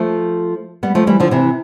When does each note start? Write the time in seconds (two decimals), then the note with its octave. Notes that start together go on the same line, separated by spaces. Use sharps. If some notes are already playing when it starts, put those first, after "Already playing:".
Already playing: F3 A3
0.83 G3 B3
0.95 F3 A3
1.07 E3 G3
1.20 D3 F3
1.31 C3 E3